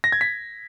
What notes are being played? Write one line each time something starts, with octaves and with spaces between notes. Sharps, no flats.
A#6
G#6
B6